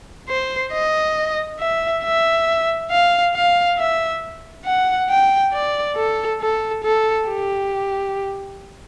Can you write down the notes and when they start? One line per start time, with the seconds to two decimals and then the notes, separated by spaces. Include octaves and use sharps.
0.29 C5
0.72 D#5
1.60 E5
2.03 E5
2.91 F5
3.34 F5
3.78 E5
4.65 F#5
5.09 G5
5.53 D5
5.96 A4
6.41 A4
6.84 A4
7.28 G4